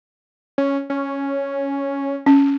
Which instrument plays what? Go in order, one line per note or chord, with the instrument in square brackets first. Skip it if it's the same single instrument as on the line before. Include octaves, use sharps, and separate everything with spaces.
[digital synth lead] C#4
C#4
[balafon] C#4